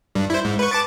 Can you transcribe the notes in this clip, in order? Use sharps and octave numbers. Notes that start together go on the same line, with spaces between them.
G2
E4 C5
G#2
B4 C#6
A5 D6 A6